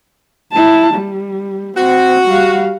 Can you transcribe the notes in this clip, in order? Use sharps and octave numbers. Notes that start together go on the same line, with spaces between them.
E4 A5
G3
C4 F#4
G3 F5